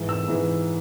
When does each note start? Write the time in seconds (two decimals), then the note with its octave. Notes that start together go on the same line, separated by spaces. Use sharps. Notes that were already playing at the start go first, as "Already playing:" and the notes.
Already playing: G#2 E3
0.09 E6
0.28 G#2 E3